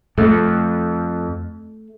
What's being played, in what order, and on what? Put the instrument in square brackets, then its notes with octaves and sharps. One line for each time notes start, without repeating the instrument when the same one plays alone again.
[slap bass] F2 [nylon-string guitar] A3